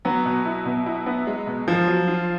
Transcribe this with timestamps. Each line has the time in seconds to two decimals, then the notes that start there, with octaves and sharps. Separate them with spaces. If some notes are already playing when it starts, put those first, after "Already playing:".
0.05 F#3 B3
0.25 B2
0.45 E4
0.66 B2
0.86 E4
1.06 B3
1.27 G#3
1.47 B2
1.68 F3 F4
1.88 F#3
2.08 F4